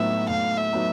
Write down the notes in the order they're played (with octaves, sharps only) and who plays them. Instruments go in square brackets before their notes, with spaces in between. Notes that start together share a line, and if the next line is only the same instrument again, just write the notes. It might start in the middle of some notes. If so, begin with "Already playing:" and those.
Already playing: [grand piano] A2 F#3 B3 D#4 [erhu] E5
[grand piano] A2 [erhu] F5
[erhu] E5
[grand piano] F#3 B3 D#4